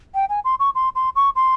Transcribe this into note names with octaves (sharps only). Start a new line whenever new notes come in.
G5
G#5
C6
C#6
C6
C6
C#6
C6